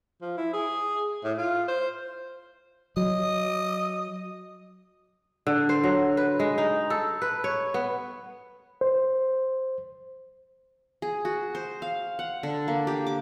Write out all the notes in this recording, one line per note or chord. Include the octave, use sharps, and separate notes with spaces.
F3
E4
G#4
A2
F4
C5
F#3 D#5
D3
C5
F#3
B4
G#3
D#4
A4
B4
C#5
B3
C5
G#4
F#4
C5
F5
F#5
D3
A#3
G4
D6